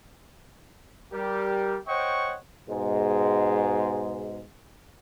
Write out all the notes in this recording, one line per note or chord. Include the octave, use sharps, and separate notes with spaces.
G3 G4 A#4
C5 C#5 D#5 F#5 G5 C#6
G#2 B2 G#3